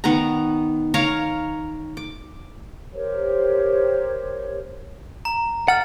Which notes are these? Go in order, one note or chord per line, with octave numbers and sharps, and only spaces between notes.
D#3 B3 F#5 A#5
A#4 C#5 F5 A#5
D6
G4 A#4 C5 C#5
A#5
F#5 F6 A6